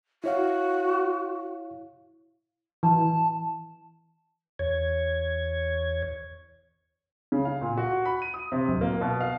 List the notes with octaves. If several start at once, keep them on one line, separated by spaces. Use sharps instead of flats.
E4 F#4 C#5 F5
E3 A5
E2 C#5 G#6
C#3
F5
A#2
F#4
B5
D#7
D#6
C3
D1
A#3
B2
F5